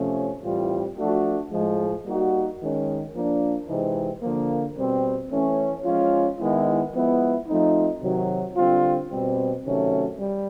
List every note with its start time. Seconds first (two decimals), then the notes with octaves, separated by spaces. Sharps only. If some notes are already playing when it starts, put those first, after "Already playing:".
Already playing: C3 F3 A3 C#4
0.44 A2 E3 G3 C4 F4
0.98 F3 A3 D4 F#4
1.52 A2 F3 G#3
2.05 G3 A#3 D#4 F#4
2.61 D#3 G#3 C#4
3.14 F3 A#3 D4
3.68 C3 E3 G#3 C4 D#4
4.22 D3 F3 A#3
4.77 B2 G3 C4
5.30 E3 A3 C#4
5.85 F3 G#3 C#4 F4
6.39 D#3 G#3 B3 E4
6.93 F3 G#3 B3 E4
7.48 F3 A3 C4 D#4
8.02 C3 D#3 F#3
8.55 D3 G3 C4 F4
9.10 B2 G3 C4
9.65 C3 D#3 F#3 A3 C#4
10.19 G3